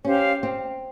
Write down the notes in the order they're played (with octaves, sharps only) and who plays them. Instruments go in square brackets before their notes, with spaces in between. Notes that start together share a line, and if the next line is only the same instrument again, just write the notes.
[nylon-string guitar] C#4 [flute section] G4 C5 F5
[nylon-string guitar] C4